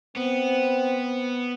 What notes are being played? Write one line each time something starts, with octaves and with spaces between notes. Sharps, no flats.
B3 C4